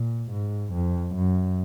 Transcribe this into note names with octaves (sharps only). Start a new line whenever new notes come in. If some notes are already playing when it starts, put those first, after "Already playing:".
Already playing: A#2
G#2
F2
F#2